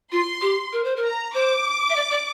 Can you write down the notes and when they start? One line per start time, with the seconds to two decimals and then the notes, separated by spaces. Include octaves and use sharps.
0.12 F4 C6
0.42 G4
0.73 A#4
0.84 C5
0.96 A#4
1.03 A#5
1.34 C5 D6
1.90 E5
1.96 D5
2.11 D5